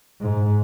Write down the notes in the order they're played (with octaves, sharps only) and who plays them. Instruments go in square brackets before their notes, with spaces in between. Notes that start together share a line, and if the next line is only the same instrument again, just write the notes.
[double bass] G#2